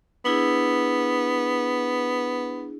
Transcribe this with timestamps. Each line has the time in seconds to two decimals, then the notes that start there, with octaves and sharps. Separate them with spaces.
0.25 B3 D4 E4 G#4